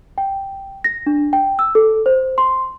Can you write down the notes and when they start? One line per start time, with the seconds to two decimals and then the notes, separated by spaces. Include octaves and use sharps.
0.18 G5
0.84 A#6
1.06 D4
1.33 G5
1.59 E6
1.75 A4
2.06 C5
2.38 C6